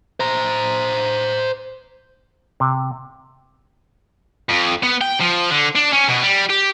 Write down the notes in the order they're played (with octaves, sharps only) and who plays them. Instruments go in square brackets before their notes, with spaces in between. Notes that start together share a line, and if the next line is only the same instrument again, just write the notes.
[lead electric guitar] C5 A#5
[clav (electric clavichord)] C3
[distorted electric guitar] F2
B3
G5
F3
D3
D4
C#4
B2
G3
G4